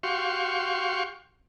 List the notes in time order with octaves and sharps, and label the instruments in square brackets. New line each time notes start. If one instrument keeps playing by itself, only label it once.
[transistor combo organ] F#4 G4 F5 C6 C#6